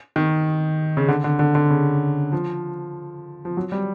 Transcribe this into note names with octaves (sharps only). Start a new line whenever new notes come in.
D#3
C#3
D3
D3
D3
D3
C#3
F3
F3
F#3
G3